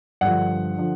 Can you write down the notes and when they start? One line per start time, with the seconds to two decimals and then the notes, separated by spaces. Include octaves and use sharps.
0.21 G2 D3 F3 F#5
0.78 D3 F3